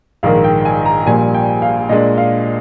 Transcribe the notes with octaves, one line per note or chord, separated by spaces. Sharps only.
A#1 G#2 D#3 A#3 F5
G5
G#5
A#5
A#1 A#2 G3 G#5
G5
F5
A#2 G#3 D4 D#5
F5